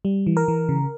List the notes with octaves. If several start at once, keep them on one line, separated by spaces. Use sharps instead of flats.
G3
E3
A#4
E3
C#3